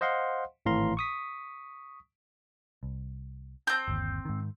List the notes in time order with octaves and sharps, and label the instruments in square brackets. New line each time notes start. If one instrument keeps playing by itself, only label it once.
[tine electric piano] C5 D#5 F5 F#5 C6
G#1 A2 E3 F5 A#5 C6
C#6 D#6 B6
[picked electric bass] C2
[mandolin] C4 G6
[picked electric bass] G1 D#2
G#2 D#3